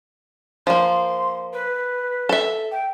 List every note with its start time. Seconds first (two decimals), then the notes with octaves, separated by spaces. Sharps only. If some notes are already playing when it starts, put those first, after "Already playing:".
0.67 F3 A#3 C6
1.53 B4
2.29 A4 E5
2.72 G5